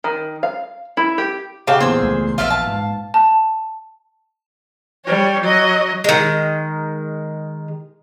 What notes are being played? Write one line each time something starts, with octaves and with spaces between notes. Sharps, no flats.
D#3
F5
E4
G4
C#3 G4 F5 F#5 A5
E2 A#2 G#4 C5 E6
C#2 A3
A#1 F4 D5 E5 F5
A5
G#2
A5
G3 C#5
F#3 D#5
D#3 G#3